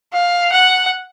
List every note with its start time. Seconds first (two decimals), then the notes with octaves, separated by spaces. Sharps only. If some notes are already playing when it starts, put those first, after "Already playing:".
0.13 F5
0.52 F#5